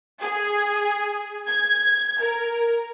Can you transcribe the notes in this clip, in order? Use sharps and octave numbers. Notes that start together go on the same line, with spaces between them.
G#4
G#6
A#4